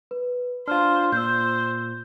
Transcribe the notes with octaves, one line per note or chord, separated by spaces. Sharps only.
B4
D4 F4 C5 F6
A#2 C5 E6 G6